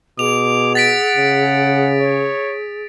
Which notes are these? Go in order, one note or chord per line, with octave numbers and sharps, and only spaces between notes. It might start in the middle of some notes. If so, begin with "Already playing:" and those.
B2 G#4 D6 F7
F#5 A6 B6 D7
C#3
C#5